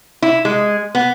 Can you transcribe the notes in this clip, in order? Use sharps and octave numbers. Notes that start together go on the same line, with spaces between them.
E4
G#3
B3